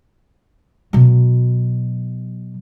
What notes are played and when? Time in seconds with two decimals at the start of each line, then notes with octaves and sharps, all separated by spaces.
0.93 B2 F#3